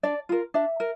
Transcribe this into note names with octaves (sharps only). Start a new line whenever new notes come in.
D4 D5
F4 A#4
D4 E5
A#4